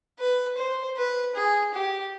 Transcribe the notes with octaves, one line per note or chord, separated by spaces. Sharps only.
B4
C5
B4
G#4
G4